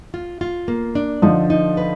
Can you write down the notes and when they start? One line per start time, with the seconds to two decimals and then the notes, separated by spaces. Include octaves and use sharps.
0.14 F4
0.41 F4
0.68 A#3
0.95 D4
1.22 D3 F3 D#4
1.50 D#4
1.77 B4